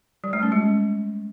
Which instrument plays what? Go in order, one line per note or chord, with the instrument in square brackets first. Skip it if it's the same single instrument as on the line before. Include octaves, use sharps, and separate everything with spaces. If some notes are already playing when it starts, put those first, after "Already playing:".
[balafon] G3
A3
C#4
G#3